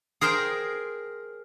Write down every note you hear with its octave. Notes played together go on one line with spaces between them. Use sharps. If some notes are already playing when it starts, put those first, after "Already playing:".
G#4 A#4 C5 G5